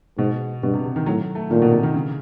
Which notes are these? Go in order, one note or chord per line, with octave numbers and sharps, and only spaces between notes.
G#2 B2
G2 B2
C3
C3
D#3
A2 F#3
A3
A#2 D#3
B2
C3
D#3
C#3